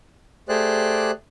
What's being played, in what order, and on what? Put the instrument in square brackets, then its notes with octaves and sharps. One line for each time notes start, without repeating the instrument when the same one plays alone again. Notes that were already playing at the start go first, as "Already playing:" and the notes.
[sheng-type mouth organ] A3 G4 G#4 C5 D5 F#6